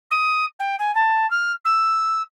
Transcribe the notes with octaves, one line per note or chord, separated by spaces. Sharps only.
D#6
G5
G#5
A5
F6
E6